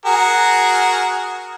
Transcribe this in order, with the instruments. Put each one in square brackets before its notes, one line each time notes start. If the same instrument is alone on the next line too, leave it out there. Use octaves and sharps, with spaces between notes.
[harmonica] F#4 G#4 A#4